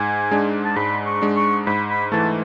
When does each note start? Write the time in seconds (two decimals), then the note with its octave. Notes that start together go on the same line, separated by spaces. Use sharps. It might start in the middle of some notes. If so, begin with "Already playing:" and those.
Already playing: G#2 G#5
0.31 G#3 D4
0.65 A5
0.76 G#2 B5
1.06 C#6
1.22 G#3 D4
1.37 C#6
1.67 G#2 B5
1.90 B5
2.12 E3 A3 A5